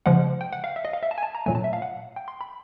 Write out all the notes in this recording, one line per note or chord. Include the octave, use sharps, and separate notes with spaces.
C#3 F3 G#3 F#5
G5
F#5
F5
E5
D#5
F5
E5
A5
G#5
A5
A#5
A#2 F#3 A3 G#5
A5
E5
F5
F#5
G5
C6
B5